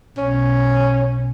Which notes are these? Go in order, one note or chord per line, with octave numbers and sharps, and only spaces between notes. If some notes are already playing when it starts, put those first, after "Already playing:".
B1 C#4